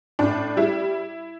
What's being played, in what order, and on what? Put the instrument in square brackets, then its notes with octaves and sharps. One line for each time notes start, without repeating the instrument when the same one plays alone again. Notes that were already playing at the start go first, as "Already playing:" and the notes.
[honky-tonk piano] A2 D4
G3 E4